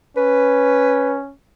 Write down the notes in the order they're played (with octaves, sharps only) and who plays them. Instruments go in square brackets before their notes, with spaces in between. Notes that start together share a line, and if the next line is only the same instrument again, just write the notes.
[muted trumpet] C#4 [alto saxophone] B4